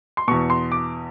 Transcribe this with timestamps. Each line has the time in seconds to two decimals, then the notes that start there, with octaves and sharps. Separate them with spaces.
0.17 C6
0.28 E2 B2 C#6
0.50 C6
0.72 D6